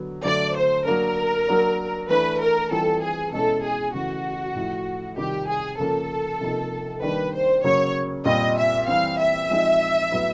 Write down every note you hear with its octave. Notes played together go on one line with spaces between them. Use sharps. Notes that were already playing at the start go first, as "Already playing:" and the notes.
Already playing: D3 F#3 B3
D3 F#3 A3 D5
C5
F#3 A#3 D4 A#4
F#3 A#3 D4
E3 A3 D4 B4
A#4
E3 G3 C4 F4 A4
G#4
B2 G#3 C#4 E4 A4
G#4
C#3 E3 A3 F#4
A2 F3 A3
C3 D#3 G3 C4 F4 G4
G#4
C#3 F3 A#3 C#4 A4
C3 F3 A#3 D#4
D#3 G3 A#3 D4 B4
C5
C#3 F#3 A#3 C#5
A#2 G3 C4 F4 D#5
E5
E3 G3 C4 F5
E5
F3 G#3 C4 D#4
A2 F#3 B3 E4